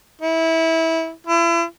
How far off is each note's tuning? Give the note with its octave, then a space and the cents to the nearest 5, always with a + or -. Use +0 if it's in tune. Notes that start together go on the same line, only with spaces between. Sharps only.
E4 -20
E4 +40